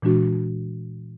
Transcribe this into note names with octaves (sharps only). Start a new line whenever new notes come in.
A#2 E3 G#3 D4 F#4